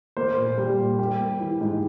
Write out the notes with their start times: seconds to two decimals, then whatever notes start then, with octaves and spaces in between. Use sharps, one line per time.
0.17 A#3 C5
0.37 A#2
0.58 G3
0.78 A#2
0.99 G3 G4
1.20 A#3
1.40 E3
1.61 G#2